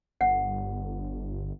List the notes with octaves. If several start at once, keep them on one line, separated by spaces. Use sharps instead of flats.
G1 F#5